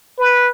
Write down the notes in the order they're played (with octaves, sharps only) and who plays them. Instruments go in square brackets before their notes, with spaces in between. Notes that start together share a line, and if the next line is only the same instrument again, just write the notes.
[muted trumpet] B4